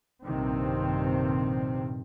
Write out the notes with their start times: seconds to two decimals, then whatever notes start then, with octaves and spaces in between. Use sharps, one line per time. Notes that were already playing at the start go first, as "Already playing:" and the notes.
0.25 A#1 G2 C3 D#3 C4